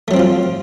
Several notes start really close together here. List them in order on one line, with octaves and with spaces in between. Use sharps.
A3 F#3 C4 F3 F4